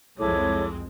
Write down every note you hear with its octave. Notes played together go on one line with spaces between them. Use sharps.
C2 F2 G#3 C4 E4 A4 C#5 D6